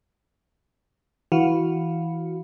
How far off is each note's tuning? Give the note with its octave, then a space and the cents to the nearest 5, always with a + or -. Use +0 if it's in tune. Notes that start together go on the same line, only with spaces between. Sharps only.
E3 -5 F#4 +0 F5 +0